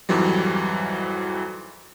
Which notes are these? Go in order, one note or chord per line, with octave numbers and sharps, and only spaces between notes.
F2 G#2 E3 F#3 G3